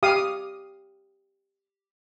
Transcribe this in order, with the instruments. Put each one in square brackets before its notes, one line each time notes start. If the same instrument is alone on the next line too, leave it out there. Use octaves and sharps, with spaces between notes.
[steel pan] G4 F5 D#6